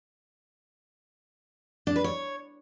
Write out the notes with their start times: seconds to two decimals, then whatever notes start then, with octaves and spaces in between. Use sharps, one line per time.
1.87 D4
1.96 B4
2.04 C#5